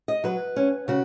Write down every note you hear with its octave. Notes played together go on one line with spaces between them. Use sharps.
D#5
F#3 B4
C#4
C#3 F#4